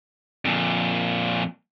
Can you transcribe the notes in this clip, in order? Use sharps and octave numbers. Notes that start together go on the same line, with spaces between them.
F2 A#2